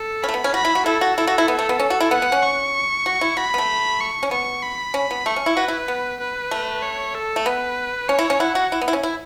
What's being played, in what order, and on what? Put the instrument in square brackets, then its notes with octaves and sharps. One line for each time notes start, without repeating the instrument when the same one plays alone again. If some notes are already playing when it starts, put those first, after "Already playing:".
Already playing: [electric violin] A4
[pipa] C#4 [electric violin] B5
[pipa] A3
B3
C#4
[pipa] F#4 [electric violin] B5
[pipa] E4
F#4
[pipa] E4 [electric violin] A4
[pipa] F#4
[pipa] E4 [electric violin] A4
[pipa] F#4
E4
B3
A3
B3
C#4
F#4
E4
[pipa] B3 [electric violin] F#5
[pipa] B3
C#4
[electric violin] C#6
[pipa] F#4
E4
[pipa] F#4 [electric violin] B5
[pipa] B3
A3
[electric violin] C#6
[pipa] C#4
[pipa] B3 [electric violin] C#6
[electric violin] B5
[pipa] C#4
B3
[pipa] A3 [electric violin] C#6
[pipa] C#4
E4
[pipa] F#4 [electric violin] B4
[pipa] E4
B3
[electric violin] B4
[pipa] A3
[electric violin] C#5
A4
[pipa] A3
[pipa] B3 [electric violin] B4
[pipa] C#4 [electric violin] C#5
[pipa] E4
C#4
[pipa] E4 [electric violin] F#5
[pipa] F#4
E4
B3
E4
C#4
E4